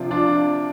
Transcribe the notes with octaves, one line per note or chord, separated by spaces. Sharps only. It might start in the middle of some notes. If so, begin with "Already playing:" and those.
Already playing: C3 F3 D4 F4
D4 F4